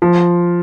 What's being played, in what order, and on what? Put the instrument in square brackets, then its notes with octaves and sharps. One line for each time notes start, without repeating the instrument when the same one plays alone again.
[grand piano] F3